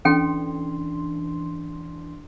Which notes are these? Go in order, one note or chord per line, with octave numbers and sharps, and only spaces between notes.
E3 C#4 D4 A4 G5 C6